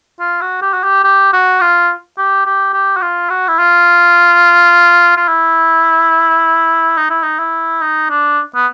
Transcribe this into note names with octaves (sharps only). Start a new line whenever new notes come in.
F4
F#4
G4
F#4
G4
G4
F#4
F4
G4
G4
G4
F#4
F4
F#4
E4
F4
F4
E4
D#4
E4
D#4
E4
D#4
D4
B3